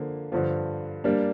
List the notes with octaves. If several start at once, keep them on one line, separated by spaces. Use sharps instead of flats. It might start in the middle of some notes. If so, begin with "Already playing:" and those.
Already playing: D3 F3 A#3
G2 D3 F3
G3 A#3 D4